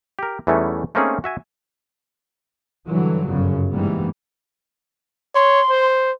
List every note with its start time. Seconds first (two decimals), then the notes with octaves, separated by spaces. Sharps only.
0.19 G4 A#4
0.47 E2 E3 G3 A3 C#4 D#4
0.95 A3 A#3 C4 C#4 D#4 G#4
1.24 F#4 E5 G#5
2.87 G2 D3 E3 F#3
3.28 G1 F#2 C#3
3.71 G#2 E3 G3 A#3 B3
5.35 C#5 C6
5.70 C5